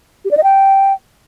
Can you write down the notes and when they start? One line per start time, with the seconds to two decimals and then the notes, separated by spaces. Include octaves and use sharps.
0.25 G4
0.31 D5
0.37 D#5
0.43 G5